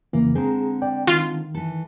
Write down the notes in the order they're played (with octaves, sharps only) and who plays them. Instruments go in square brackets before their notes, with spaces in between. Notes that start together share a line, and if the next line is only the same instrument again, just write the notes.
[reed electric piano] F2 C#3 E3 [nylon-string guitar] A#3
[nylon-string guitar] D3 G#3 C4 [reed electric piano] G#4 A#5
[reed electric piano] D5 G5
[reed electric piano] D#3 [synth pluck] F4
[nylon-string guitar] E3 A4